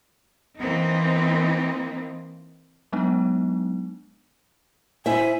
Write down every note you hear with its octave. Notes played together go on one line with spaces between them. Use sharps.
E3 A#3 C4 D#4
F#3 G#3 B3 D4 D#4
E4 C5 E5 G#5